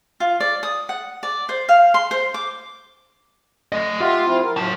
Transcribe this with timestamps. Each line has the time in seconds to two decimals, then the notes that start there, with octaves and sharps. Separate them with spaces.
0.20 F4
0.40 D5
0.63 D#6
0.89 F#5
1.23 D5
1.49 C5
1.69 F5
1.94 C6
2.11 C5
2.34 D6
3.72 A3 D#5
4.00 F4 G4 E5 F#5
4.25 F3 C4 E4
4.43 A#4
4.57 A2 F#3 A5